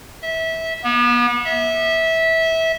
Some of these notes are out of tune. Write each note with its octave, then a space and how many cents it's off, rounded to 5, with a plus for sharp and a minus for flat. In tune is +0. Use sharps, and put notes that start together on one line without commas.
E5 -20
B3 -40
E5 -20